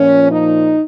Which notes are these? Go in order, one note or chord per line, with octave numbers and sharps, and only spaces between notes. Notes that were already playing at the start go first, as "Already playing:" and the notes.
Already playing: A#2 F3 C#4
D#4